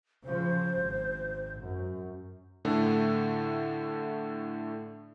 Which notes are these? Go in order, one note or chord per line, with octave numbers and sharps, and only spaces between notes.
C#3 F3 C5
G#1
F#2
A2 D3 A3 A4